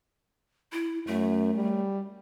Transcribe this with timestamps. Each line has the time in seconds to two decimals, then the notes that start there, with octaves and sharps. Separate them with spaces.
0.72 E4
1.07 F#2 A3
1.54 G3